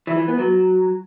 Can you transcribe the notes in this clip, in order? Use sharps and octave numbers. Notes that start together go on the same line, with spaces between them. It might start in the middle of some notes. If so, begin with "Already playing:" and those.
E3
E3
B3
F#3